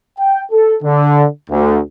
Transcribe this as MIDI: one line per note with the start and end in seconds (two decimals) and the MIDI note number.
0.19 0.42 79
0.52 0.74 69
0.83 1.25 50
1.50 1.79 38